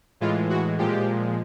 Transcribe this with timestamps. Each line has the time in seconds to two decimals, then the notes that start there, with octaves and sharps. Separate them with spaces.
0.21 A2 E3 G#3 F4
0.50 F#4
0.78 A#2 F3 G#3 G4